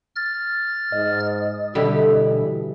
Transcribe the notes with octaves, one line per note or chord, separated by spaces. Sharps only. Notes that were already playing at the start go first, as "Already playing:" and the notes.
F6 A6
G#2 D#5
B2 D3 G3 E4 A4
E3 D4